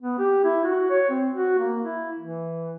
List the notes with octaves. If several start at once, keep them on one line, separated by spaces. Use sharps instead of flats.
B3
G4
E4
F#4
C#5
C4
F#4
A#3
E4
E3